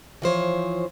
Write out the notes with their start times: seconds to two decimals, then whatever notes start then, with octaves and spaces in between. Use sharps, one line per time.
0.22 E3 F3 C5 C#5